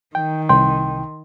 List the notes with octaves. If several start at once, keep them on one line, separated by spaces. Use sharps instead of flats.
D#3 G5
C2 G5 C6